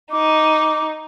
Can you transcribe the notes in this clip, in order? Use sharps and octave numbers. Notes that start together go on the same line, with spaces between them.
D#4 D6